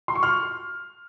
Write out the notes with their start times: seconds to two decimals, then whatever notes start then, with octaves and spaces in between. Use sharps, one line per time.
0.08 C6
0.15 C#6
0.23 F6